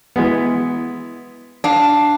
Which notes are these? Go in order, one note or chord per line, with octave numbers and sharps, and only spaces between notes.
E3 G#3 B3
D4 F5